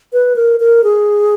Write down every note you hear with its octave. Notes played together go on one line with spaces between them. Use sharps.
B4
A#4
A#4
G#4